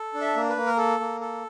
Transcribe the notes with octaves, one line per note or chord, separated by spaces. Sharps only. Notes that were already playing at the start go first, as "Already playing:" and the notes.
Already playing: A4
D4
E5
A#3
B4
A#3
A#4
A4
A#3
A4